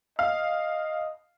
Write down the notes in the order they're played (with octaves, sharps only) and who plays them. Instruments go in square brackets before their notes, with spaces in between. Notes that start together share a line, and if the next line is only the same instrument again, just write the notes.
[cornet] D#5 [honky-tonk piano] F5